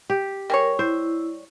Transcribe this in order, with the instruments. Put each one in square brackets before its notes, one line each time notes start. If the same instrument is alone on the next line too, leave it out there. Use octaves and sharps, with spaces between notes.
[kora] G4
[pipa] G3 G#4 C#5 [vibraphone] A#4
[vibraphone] E4 [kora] C5